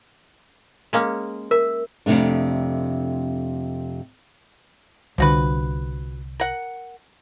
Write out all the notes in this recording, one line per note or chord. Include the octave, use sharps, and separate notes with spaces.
G#3 A#3 C#4
A#4 E5
F2 G#2 C3 A3 D4
C2 D3 F3 F#4 B4
A#4 F#5